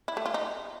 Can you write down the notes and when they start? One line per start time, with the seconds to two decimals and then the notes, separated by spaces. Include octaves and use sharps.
0.08 E4
0.17 A3
0.26 F4
0.34 D#4